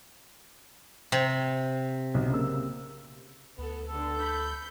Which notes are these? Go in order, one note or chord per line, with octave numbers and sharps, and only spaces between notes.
C3
B1
C#3 A#3 E6
D2 B3 A4
D3 B3 A4
B5 G6